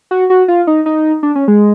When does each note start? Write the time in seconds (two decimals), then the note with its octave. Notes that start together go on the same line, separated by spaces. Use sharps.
0.11 F#4
0.30 F#4
0.48 F4
0.67 D#4
0.86 D#4
1.23 D4
1.35 C#4
1.48 G#3